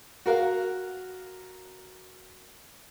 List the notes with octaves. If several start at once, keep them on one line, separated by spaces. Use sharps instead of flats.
F#4 A#4 F5